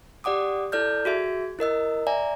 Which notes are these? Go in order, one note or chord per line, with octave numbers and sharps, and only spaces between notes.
G4 D5 F#5 D6 D#6
E4 A4 D5 F6 G6
F#4 G#4 E5 G#6
E4 A#4 D#5 E6
D5 E5 G#5 A#5